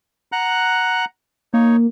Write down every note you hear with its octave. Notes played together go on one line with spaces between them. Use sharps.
F#5 A#5 F#6
A#3 D#4 C#5